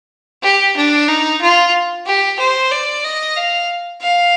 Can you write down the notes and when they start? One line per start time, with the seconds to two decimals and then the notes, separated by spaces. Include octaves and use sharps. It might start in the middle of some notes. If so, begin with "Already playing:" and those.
0.43 G4
0.76 D4
1.08 D#4
1.41 F4
2.06 G4
2.39 C5
2.71 D5
3.04 D#5
3.36 F5
4.02 F5